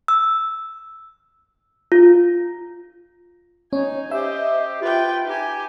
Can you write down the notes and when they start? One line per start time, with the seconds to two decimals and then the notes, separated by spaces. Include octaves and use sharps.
0.08 E6
1.92 F4
3.73 C#4 D#4 G#5
4.11 G4 C5 D#5 E5
4.82 F4 B4 G5
5.27 D#4 G4 G#5